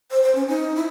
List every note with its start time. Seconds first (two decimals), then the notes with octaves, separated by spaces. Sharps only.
0.11 C5
0.23 C5
0.35 C#4
0.48 D#4
0.76 E4